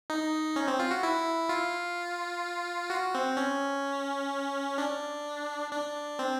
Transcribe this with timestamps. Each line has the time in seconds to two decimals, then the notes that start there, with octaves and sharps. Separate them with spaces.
0.10 D#4
0.56 C#4
0.68 C4
0.79 F4
0.91 F#4
1.03 E4
1.49 F4
2.90 F#4
3.15 C4
3.37 C#4
4.78 D4
5.71 D4
6.19 C4